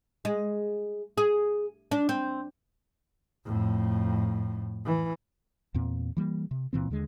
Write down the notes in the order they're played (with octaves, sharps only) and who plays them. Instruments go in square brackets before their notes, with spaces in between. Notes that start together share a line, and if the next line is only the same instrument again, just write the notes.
[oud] G#3
G#4
D4
C4
[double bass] F2 A2
E3
[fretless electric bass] E2 A#2 C4
E3 G3 A#3
C3
C#2 A#2 E3 C4
D#2 D3 G#3